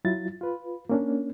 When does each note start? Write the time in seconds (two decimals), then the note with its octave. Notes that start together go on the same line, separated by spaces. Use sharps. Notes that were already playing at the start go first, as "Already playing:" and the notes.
0.05 F#3 E4 F4 A6
0.41 F4 B4
0.89 A#3 C#4 D4